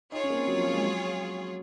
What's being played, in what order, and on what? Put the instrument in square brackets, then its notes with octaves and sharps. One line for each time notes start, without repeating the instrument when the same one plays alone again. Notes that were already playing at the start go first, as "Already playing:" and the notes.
[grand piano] D#4 [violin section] F4 G#4 C#5
[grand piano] C#4
A#3
C4
F#3
F3
F#3
G#3
F#3